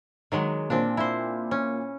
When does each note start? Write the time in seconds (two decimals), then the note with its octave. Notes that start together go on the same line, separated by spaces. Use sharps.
0.32 D#3 F#3 G#3
0.70 A#2 C4 D4
0.97 E4 C5
1.51 C#4